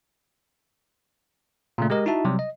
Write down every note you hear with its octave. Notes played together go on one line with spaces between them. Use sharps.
A#2 C#3 A3
G#3 G4 A#4 D#5
D#4 E4 F#4 E5 A5
C3 F#3 G3
D#5